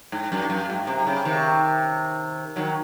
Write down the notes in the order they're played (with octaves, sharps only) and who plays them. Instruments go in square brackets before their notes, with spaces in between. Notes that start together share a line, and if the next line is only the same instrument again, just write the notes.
[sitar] G#2
F#2
F#2
G#2
C3
C#3
C3 D#3
D#3 F#3